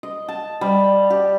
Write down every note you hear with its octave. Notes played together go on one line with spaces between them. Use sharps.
D#5
A5
G3
G4